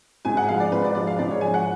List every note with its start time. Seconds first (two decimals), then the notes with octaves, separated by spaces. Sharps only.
0.25 G#2 G#5
0.37 F#5
0.49 F3 G#3 F5
0.60 D5
0.72 G#2 B4
0.84 D5
0.95 F3 G#3 D5
1.07 F5
1.19 G#2 D5
1.31 C#5
1.41 F3 G#3 G#5
1.54 F#5